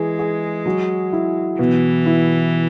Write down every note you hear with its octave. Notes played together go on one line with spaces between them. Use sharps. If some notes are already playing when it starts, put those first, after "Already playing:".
Already playing: E3 G#3 G#4
G#4
F#3
E4
B2 E3
E4